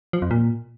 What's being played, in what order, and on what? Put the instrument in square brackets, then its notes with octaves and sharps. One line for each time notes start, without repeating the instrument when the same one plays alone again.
[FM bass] F3
F2
A#2